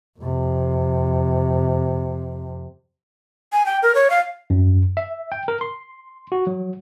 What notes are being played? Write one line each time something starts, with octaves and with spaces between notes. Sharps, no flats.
F2 C3
G#5
G5
A#4
C#5
F5
F#2
E5
G5
A#4
C6
F#4
F#3